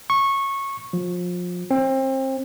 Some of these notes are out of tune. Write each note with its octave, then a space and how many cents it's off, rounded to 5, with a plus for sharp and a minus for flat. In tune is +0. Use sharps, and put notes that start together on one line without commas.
C#6 -15
F3 +30
C4 +30